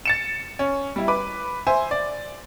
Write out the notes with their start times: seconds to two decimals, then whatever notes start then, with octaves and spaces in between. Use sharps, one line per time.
0.06 A6 C#7 E7
0.59 C#4
0.96 G3 E4
1.08 B4 D6
1.67 C5 E5 G#5
1.91 D5